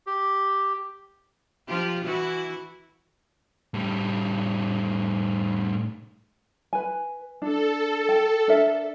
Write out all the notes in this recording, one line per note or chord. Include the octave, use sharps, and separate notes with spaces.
G4
F3 F4 G4
E3 E4 F#4
A2 G3
B4 G#5
D4 A4
G5
D4 A#4 E5